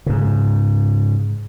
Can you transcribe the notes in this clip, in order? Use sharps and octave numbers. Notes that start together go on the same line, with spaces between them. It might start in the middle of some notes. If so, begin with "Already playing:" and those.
G#2 C#3